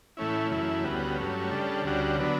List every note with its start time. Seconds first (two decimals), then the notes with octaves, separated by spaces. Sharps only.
0.17 A2 E3 A3 C#4 E4
0.51 F#2 C#3 E3 A3 E4
0.84 D2 C#3 G3 B3 F#4
1.18 G2 F#3 A3 C#4
1.51 C#3 G3 D4 A4
1.84 D2 C#3 G3 D4 F#4
2.17 D3 F#3 B3 D4